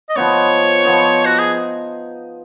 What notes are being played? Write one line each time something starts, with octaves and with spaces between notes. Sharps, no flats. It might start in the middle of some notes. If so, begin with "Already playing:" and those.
D#5
F3 B3 D#4 C#5
F3 B3 D#4
F#4
G#4